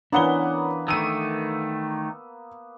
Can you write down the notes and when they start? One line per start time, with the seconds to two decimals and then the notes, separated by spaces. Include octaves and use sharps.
0.12 E3 A#3 B3 C#4 D4 B4 F#5 G7
0.88 D#3 A3 E6 D#7